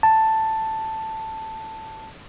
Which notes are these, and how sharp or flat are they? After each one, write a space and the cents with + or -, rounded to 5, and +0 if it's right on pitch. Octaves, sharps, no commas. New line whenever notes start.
A5 +5